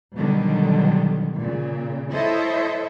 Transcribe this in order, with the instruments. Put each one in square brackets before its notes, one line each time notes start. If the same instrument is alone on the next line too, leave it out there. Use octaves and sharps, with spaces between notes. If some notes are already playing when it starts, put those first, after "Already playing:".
[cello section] B2 D3 D#3 F#3 G3
A#2 C#3
E4 A4 C5 C#5 D#5 E5